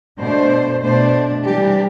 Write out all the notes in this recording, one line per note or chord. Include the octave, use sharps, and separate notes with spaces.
B2 A3 D4 C5
B2 A3 D4 C5
C3 E3 G3 D4 G4